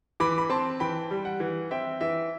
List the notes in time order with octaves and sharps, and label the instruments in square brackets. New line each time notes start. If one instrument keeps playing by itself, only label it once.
[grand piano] E3 B5 D6
B5
C4 A5 C6
E3 G5 B5
G3
F#5
E3
C4 E5 G5
E3 E5